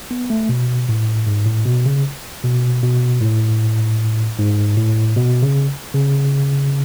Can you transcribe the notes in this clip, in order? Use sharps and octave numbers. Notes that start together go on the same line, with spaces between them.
B3
A3
B2
A2
G#2
A2
B2
C#3
B2
B2
A2
G#2
A2
B2
C#3
C#3